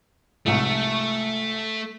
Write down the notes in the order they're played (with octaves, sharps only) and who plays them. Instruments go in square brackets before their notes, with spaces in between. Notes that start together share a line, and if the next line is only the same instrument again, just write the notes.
[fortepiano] C2 G#2 F3 [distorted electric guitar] A3